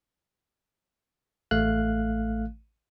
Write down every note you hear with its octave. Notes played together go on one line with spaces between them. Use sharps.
A1 A3 F5 F#6